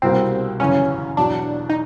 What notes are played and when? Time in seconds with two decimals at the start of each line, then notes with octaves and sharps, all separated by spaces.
0.02 C2 B2 G3 A#3 C4
0.60 G1 F#2 C#3 E3 C#4
1.17 E2 B2 F#3 D4
1.70 D#4